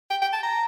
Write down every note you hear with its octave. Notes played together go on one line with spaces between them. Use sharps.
G5
G5
A5
A#5